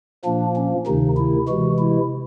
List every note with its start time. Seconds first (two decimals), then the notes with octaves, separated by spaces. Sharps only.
0.25 A#2 F3 A#3 D4
0.56 C#4
0.87 D2 C3 D#3 D#4
1.17 E4
1.48 C3 E3 G#3 F#4
1.79 E4